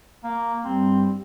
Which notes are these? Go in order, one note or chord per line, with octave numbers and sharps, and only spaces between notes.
A#3
G2 G3 C4